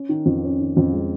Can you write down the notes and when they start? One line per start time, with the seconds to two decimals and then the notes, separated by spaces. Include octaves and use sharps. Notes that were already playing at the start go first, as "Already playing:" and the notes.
Already playing: C#4
0.09 D#3
0.26 F2
0.43 C#4
0.60 D#3
0.77 F2
0.93 G#3